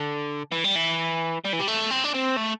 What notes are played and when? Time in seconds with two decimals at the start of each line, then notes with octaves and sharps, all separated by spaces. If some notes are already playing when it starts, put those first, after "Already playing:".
Already playing: D3
0.52 E3
0.64 G3
0.75 E3
1.45 G3
1.53 E3
1.59 G3
1.67 A3
1.91 C4
2.04 D4
2.15 C4
2.37 A3